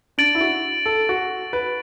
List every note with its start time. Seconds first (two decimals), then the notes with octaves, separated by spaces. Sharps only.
0.18 D4 A6 D7 F#7
0.35 E4
0.41 F#4
0.86 A4
1.09 F#4
1.53 B4